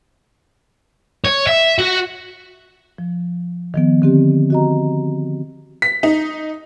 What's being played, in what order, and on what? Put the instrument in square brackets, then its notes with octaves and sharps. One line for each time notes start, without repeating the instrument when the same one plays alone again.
[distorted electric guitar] C#5
E5
F#4
[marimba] F3
D#3 F3 B3
D3 C4 G4
F#4 D#5 A#5
[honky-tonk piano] B6
D#4